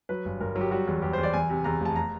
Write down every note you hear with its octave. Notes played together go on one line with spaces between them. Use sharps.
F#3 B4
G1
G1 A#4
F#3
G4
G3 F#4
E2
E2 G4
E2 C5
D5
E2 G#5
C3
E2 A#5
F1
A5
A#5